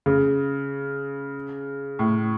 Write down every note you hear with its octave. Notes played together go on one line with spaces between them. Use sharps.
C#3
A2